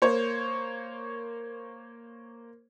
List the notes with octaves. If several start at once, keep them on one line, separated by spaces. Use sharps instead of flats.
A#3 C5 C#5